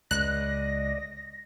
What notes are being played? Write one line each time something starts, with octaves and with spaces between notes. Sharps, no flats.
C#2 D5 D#5 F#6 A#6